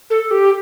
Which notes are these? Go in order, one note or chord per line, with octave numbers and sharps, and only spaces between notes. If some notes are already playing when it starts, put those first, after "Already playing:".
A4
G4